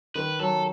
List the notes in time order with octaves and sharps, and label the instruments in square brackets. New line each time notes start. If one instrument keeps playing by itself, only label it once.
[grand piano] D#3 [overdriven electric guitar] B4
[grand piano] F#3 [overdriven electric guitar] A4